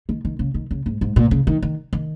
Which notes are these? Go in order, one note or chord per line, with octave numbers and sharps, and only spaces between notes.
D#3
D#3
C#3
D#3
C#3
G#2
G#2
A#2
C#3
D#3
D#3
D#3